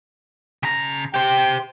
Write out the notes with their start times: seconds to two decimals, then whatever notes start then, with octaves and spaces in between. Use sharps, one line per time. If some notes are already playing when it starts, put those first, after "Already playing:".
0.63 C#3 A#5
1.14 G4 C5 G5